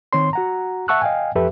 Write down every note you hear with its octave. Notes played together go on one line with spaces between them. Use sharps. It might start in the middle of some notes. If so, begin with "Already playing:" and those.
D#3 C4 C#5 C6
F#4 F#5 A#5
E5 F#5 A5 C#6 E6 F#6
D#5 F5 G5 G#5
F2 F3 G4 A4 B4 E5